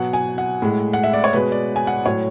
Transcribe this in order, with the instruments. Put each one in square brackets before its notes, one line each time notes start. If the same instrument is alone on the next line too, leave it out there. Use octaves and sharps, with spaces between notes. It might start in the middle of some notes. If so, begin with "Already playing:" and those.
Already playing: [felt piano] B2 F#3 F#5
G#5
F#5
A2 G#3
F#5
E5
D5
C#5
B2 G#3 B4
D5
G#5
F#5
A2 F#3 C#5